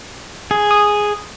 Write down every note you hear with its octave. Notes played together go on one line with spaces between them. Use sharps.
G#4
D#6